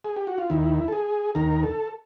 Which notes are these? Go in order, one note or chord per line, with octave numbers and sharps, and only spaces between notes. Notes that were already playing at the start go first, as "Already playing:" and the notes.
G#4
G4
F#4
F4
D#2 D#3 E4
A4
G#4
D#2 D#3 A#4
A4